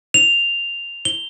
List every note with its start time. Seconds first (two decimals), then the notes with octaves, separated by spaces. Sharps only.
0.14 F7
1.05 G7